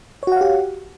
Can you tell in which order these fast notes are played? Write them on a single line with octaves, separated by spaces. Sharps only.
C#5 F#4 F#5 F5 G4